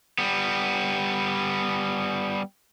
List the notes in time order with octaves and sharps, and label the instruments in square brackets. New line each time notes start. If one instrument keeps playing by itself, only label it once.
[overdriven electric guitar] G3 B3